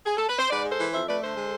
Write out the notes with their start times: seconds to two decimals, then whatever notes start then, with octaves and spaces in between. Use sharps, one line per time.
0.06 G#4
0.17 A4
0.28 B4
0.39 C5
0.49 G#2 B4 D5
0.65 G#3
0.71 A4 C5
0.79 E3
0.93 F2 C5 E5
1.08 A3 B4 D5
1.22 D3 A4 C5
1.37 G#3